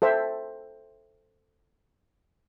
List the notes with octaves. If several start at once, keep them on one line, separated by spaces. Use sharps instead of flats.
A4 C5 E5 G5